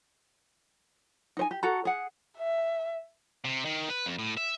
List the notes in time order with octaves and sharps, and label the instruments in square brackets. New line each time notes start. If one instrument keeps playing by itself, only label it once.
[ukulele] D#4 C5 G#5
G4
F#4 A4 F#5 A#5
G#4 F#5
[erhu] E5
[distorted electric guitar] C3
D#3
B4
F2
A2
E5